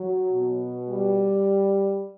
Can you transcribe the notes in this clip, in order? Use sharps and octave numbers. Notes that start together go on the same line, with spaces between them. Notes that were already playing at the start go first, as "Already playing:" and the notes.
Already playing: F#3
B2
G3